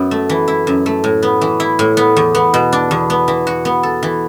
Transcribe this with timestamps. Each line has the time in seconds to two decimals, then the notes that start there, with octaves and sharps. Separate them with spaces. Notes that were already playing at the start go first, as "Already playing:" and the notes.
Already playing: F#2 B3
0.11 A3
0.29 E3
0.48 E4
0.67 F#2
0.86 A3
1.04 A2
1.23 B3
1.41 E3
1.60 E4
1.79 A2
1.97 B3
2.17 E2
2.35 B3
2.54 B2
2.73 D4
2.91 E2
3.10 B3
3.28 E3
3.47 F#4
3.65 B3
3.83 A4
4.03 E3